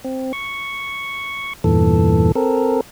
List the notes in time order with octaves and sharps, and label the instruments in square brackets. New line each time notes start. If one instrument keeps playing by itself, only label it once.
[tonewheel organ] C4
C#6
E2 G2 A#2 E3 A4
C4 A4 A#4